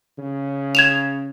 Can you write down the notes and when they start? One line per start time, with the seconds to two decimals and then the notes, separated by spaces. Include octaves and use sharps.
0.18 C#3
0.75 G#6 E7 F7